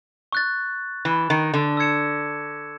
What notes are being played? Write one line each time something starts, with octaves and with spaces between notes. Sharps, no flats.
C#6 F#6 A6
E3
D#3
D3
E6 G#6 C#7 E7